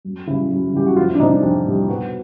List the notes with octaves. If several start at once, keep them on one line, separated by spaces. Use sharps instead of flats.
F#2
C#3 E3 G3 E4
F#2
C#3 E3 G3 G4
F#4
F2 F4
E4
D4
C3 E3 G3 D#4
D4
F2 D4
C3 E3 G3 G4
B2 F#4